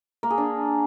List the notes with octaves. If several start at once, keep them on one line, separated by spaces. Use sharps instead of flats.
A#3
G#4
D4